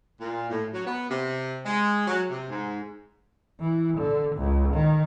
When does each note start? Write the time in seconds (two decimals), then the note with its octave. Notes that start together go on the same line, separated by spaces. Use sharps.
0.21 A#2
0.50 A2
0.73 F#3
0.85 B3
1.10 C3
1.66 G#3
2.08 F#3
2.30 C3
2.49 G#2
3.60 E3
3.98 D3
4.36 C#2
4.74 D#3